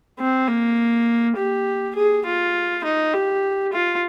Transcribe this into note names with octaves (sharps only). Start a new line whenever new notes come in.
C4
A#3
G4
G#4
F4
D#4
G4
F4